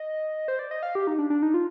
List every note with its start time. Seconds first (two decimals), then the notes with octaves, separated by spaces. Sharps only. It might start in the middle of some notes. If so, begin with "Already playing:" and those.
Already playing: D#5
0.48 C5
0.59 D5
0.71 D#5
0.83 F5
0.95 G4
1.07 D#4
1.19 D4
1.30 D4
1.42 D#4
1.54 F4